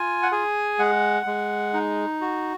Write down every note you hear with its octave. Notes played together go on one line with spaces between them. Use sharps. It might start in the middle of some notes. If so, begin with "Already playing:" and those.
Already playing: F4 G#5
F#5
G#4 G#5
G#3 F#5
G#3
D#4
F#4